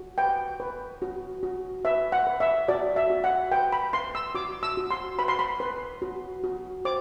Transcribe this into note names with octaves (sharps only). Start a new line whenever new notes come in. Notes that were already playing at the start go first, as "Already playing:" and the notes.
Already playing: F#4
B4 G5
B4
F#4
F#4
B4 E5
F#5
B4
E5
F#4 D5
E5
F#4
F#5
B4 G5
B5
B4 C6
E6
F#4 D6
E6
F#4
C6
B4 B5
C6
B5
B4
F#4
F#4
C5 D6